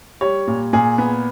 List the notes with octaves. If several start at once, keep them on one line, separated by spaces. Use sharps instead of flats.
G3 C#5
A#2
A#2 G#4
B3